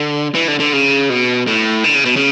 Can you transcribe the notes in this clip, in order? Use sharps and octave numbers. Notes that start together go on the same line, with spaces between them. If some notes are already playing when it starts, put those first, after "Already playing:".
Already playing: D3
E3
D3
D3
C#3
B2
A2
D3
C#3
B2
C#3